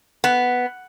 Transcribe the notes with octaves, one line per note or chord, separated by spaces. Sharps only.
B3